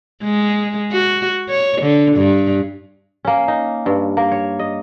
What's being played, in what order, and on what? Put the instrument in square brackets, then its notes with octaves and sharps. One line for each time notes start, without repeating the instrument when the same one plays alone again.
[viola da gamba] G#3
F#4
C#5
D3
G2
[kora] A#3 C#4
D#4
G2
A#3 A#4
C#5
D#5